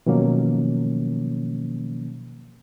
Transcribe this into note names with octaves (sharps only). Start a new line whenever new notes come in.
B2 D#3 F3 F#3 A#3 C#4